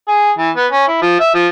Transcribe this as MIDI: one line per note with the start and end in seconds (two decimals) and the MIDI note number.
0.08 0.31 68
0.38 0.50 52
0.56 0.66 59
0.71 0.85 61
0.88 1.01 64
1.02 1.19 53
1.20 1.29 76
1.34 1.48 53